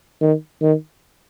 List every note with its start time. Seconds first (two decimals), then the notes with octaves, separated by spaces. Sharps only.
0.21 D#3
0.61 D#3